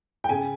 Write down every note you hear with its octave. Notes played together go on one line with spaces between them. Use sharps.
G5
C#3 G#5